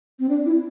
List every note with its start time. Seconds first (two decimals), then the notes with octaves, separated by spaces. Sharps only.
0.19 C4
0.29 D4
0.46 E4